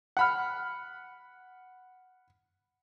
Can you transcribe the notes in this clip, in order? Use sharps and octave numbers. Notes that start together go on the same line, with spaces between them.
F#5 B5 F6